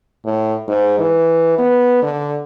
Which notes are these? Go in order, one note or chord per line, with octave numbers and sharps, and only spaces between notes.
A2
G#2
E3
B3
D3